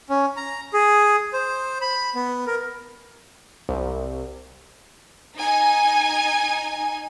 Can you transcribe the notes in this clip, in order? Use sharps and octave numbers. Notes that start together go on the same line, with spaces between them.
C#4
A#5
G#4
C5
B5
B3
A#4
C2
D#4 G#5